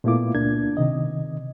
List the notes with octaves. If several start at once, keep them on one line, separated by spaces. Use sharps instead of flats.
A#2 A3 B3 E4 F4 D6
C#2 A#3 D4 G#6
C3 D#3 D#5